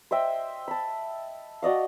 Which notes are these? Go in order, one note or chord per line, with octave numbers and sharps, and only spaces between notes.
C5 D#5 E5 G5
A5 B5
F#4 D5 D#5 F5